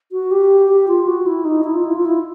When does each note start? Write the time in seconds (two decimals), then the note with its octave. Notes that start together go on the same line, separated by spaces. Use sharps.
0.12 F#4
0.31 G4
0.69 G4
0.88 F4
1.07 F#4
1.26 E4
1.45 D#4
1.64 E4
1.74 F4
1.85 E4
1.95 F4
2.05 E4